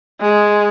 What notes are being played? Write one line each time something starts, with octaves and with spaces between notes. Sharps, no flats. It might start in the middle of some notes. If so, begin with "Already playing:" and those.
G#3